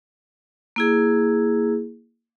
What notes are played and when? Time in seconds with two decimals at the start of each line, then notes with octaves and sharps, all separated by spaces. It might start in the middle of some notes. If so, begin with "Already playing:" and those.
0.76 A#3 E4 G#4